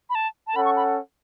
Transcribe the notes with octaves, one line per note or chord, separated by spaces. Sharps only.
B5
A5
A5
C#4 A4 F#5 B5
C#6
B5